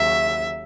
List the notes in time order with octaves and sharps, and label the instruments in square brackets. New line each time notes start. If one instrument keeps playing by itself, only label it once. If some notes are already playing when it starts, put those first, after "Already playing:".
Already playing: [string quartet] D#2 C#3 F#3 E5